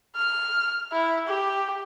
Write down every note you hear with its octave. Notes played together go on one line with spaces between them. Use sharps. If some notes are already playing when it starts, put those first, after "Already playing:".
F6
E4
G4